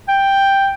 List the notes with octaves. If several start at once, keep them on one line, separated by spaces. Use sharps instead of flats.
G5